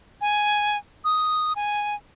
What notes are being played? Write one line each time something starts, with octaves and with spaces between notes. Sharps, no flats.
G#5
D#6
G#5